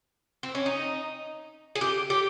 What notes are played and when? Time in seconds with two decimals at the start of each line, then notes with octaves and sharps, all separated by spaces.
0.43 C4
0.55 C#4
0.66 D#4
1.75 G#4
1.81 G4
2.10 G4